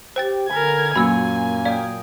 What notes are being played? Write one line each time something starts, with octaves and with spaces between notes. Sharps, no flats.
G4 C5 G5 A6
D3 A#4 B4 G#5 G#6
F#2 A#2 A#3 G#5 B5 E6
A#4 D5 F5 G5 D#6